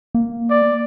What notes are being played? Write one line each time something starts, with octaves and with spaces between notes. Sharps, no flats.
A#3
D5